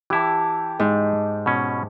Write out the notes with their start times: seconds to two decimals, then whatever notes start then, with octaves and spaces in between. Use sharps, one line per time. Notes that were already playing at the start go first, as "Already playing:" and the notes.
0.10 E3 E4 G4 A5
0.79 G#2
1.46 B2 C#4